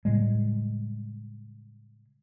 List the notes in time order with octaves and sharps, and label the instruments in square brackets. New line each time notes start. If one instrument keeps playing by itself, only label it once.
[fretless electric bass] A2 C#3 G3 G#3